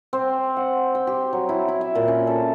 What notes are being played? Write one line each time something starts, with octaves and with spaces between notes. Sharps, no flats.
C4
F#5
G5
G4
F#3
E4
E4
E5
A#2
C#4
A4